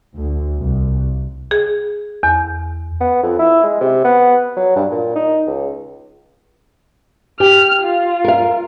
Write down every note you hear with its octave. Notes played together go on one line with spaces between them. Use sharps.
D2
C2
G#4
E2
B3
F2
E4
G#3
C3
B3
F#3
G2
A#2
D#4
C#2
G4 G5 F6
F4
A#4 F5